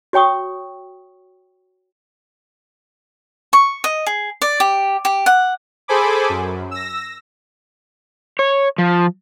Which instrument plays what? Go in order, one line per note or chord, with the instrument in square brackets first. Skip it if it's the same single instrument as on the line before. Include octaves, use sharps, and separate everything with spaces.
[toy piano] F#4 C#5 G5 C#6 D#6
[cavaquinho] C#6
D#5
G#4
D5
G4
G4
F#5
[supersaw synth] G#4 A4 C5 G#5 B5 D6
F#2
E6 A#6
[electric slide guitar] C#5
F3